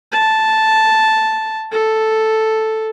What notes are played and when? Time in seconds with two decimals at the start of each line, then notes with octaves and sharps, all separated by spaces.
0.12 A5
1.72 A4